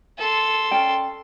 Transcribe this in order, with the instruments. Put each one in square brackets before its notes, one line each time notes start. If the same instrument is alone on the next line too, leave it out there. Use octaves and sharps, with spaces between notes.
[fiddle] A4 C6
[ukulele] C#4 D5 G5